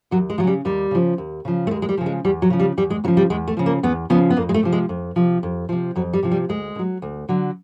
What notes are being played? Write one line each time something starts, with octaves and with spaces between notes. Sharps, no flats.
D#2 F#3
G#3
F3 F#3
C#3 G3
D#2 G3
C#3 F3
D#2
C#3 F3
A3
D#2 G#3
G#3
G3
C#3 F3
G#3
E2 G3
F#3
C#3 F3
G3
E2 G3
G#3
C#3 F3 F#3
G3
E2 G#3
A3
C#3 F3
A#3
E2 B3
C#3 F3 B3
B3
F2 A#3
G#3
A3
C3 F3
G#3
F2
C3 F3
F2
C3 F3
F2 F#3
G3
C3 F3
G3
D2 G#3
D3
F#3
D2
D3 F#3